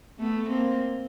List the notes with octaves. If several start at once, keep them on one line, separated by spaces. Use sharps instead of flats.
A3 B3
A#3 C4